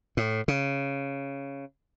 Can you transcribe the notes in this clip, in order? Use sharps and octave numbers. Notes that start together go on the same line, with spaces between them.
A2
C#3